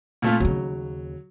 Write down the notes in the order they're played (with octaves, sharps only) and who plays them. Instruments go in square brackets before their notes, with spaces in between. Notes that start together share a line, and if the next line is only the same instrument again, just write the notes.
[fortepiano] A#2 A3 F4
[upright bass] D#2 C#3 [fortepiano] F#3